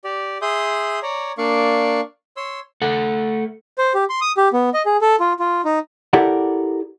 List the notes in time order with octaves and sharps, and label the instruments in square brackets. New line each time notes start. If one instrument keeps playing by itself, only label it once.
[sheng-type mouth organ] G4 D5
G#4 E5 C6 D#6 G6
C#5 D5 A#5
A#3 D4 D5 F5 C#6
C#5 C6 E6
[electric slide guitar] A3 A4 F#5
[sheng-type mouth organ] C5
G4
C6
D#6
G4
B3
D#5
G#4
A4
F4
F4
D#4
[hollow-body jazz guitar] E4 G4 A4 A#4 D5 F#5